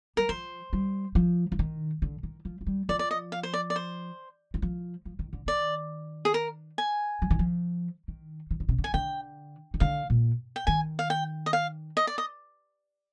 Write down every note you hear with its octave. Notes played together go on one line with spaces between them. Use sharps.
G3 A#4
F3 C5
G3
F3
F3
D#3
D3
D#3
F3
F3
G3
F3 D5
D5
D#5
F5
C5
D5
D5
C5
D#3
F3
F3
D#3
D3
D#3 D5
G#4
A#4
G#5
F3
D#3
F3
D#3
D#3
D3
C3
D3
G#5
D3 G5
D#3
D3 F5
A#2
G5
D#3 G#5
F5
G5
D#5
F5
D#5
D5
D#5